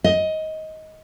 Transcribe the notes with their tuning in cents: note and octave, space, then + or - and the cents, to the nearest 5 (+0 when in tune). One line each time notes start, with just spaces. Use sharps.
D#5 +15